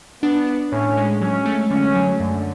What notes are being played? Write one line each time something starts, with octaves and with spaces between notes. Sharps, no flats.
B3 D4
D4
A2 C#4
G#3
F#3 C#4
A3
D3 C#4
F#3
F#2 D3